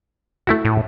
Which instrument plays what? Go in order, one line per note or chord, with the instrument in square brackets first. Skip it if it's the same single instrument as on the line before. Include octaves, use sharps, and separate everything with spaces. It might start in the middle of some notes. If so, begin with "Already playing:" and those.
[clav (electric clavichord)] A3 E4 F#4
[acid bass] A2